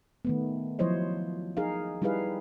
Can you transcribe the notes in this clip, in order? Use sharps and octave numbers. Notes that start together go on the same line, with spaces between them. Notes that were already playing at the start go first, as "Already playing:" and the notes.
D#3 A3 B3
F3 F#3 E4 C5 C#5 D#5
D#4 G#4 A#4 F5
G3 D#4 E4 G#4 B4 F5